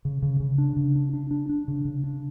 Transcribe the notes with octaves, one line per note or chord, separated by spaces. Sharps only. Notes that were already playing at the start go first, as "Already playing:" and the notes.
C#3
C#3
C#3
D4
C#3
D4
D4
D4
D4
C#3
C#3
D4